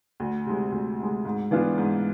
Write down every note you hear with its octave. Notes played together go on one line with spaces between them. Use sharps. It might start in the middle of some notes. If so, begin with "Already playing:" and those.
D2
C3 G#3
D2
C3 G#3
G#2
E3 B3 D4 F4
G#2